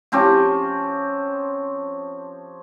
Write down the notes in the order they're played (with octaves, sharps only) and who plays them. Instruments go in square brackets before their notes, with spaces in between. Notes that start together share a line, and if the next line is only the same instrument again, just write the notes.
[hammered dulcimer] F3 C4 C#4 G4